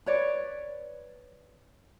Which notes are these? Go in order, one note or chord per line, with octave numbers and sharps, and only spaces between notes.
B4 C#5 D5